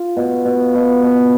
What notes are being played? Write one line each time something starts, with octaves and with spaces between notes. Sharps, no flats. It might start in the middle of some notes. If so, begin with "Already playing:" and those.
Already playing: F4
B2
B2
B2
B2